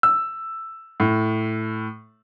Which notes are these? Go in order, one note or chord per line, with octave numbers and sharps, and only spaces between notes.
E6
A2